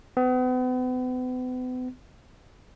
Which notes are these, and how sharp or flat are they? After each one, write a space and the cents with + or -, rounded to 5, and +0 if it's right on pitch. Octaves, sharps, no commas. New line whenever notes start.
B3 +40